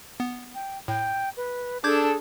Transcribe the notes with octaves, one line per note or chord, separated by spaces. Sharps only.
B3
G5
A2 G5
B4
D4 G#4 A4 D6 G6 G#6